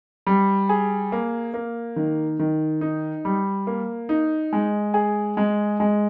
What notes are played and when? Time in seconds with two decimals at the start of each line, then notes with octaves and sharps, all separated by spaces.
0.27 G3
0.69 G#4
1.12 A#3
1.54 A#3
1.96 D#3
2.39 D#3
2.81 D#4
3.25 G3
3.67 A#3
4.09 D#4
4.53 G#3
4.94 G#4
5.37 G#3
5.80 G#3